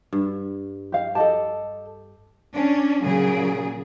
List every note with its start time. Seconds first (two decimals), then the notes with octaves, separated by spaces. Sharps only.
0.13 G2
0.92 G4 F5
1.15 G4 A4 D#5 A5
2.51 C#4 D4
3.02 A#2 C#3 F#3 G#4